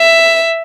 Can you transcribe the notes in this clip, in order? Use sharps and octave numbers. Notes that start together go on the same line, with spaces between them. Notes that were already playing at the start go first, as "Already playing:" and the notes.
Already playing: E5